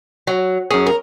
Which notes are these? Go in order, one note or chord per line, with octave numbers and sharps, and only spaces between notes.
F#3
F#2 C#4 G#4
A#4